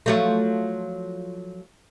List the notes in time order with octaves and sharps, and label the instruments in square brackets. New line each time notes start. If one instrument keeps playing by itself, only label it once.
[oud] F3 F#3 A3